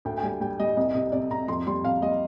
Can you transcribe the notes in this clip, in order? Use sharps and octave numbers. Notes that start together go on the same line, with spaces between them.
D2 G5
G5
G3 G#5
G3 G5
G3 D#5
C2 D#5
C3 D#5
C3 D5
C3 A#5
F2 C6
G3 C6
F2 F5
G3 D#5